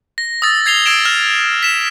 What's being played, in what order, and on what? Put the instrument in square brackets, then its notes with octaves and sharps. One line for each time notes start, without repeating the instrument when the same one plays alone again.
[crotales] A#6
D#6 E6 A6 A#6
G#6 C7 F7 G7
E6 G#6 A#6 D7 E7
F6 A#6 E7
B6 E7